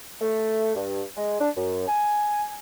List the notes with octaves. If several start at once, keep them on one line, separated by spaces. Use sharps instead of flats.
A3
G2
G#3
D4
F#2
G#5